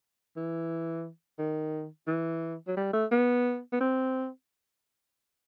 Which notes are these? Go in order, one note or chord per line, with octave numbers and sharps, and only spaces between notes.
E3
D#3
E3
F#3
G3
A3
B3
B3
C4